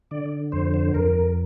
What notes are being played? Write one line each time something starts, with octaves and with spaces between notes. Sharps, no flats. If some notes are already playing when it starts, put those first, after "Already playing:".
D3 D5
F2 C5
C5
F2 A#4